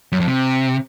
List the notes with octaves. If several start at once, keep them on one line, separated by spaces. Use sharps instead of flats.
F#2
F2
C3